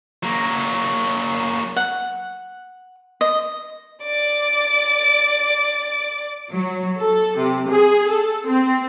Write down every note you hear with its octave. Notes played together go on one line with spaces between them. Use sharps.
F#3 A#3
F#5
D#5
D5 D6
F#3
A4
C3
G#4
A4
C4